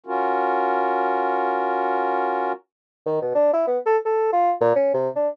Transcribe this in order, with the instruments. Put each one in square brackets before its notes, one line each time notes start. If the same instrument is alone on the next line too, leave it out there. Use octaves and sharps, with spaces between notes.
[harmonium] C#4 F4 F#4 A#4
[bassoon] D#3
B2
D4
E4
B3
A4
A4
F4
A#2
C#4
C3
D4